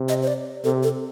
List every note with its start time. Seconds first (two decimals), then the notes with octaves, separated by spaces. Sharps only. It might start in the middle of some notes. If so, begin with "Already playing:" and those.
Already playing: C3
0.09 D#5
0.22 C5
0.28 D5
0.64 C3 A4
0.83 A4